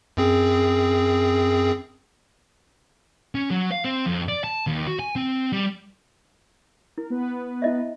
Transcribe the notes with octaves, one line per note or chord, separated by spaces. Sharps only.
F#2 C4 G#4
C#4
F#3
F5
C4
F2
D5
A5
D#2
F#4
G#5
C4
G3
E4 A#4
B3 B4
E4 D#5 E5